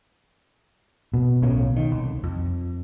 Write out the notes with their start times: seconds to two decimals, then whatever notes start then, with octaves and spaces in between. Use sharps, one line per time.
1.14 B2
1.42 B1 A2 C#3
1.77 D#3
1.92 C2
2.24 F2